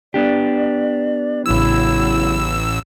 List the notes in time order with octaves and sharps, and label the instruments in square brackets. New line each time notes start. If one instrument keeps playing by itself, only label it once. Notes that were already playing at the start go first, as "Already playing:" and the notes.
[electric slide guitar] B3 D4 G4 [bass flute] D5
[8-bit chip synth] A1 E6 [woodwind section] C#3 E4 [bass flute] F#3